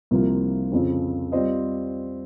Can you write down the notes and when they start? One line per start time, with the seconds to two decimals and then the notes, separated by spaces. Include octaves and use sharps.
0.11 C2 C3 F3 A#3 F4
0.72 F2 C#3 F3
1.32 G3 C4 F4 C5 D#5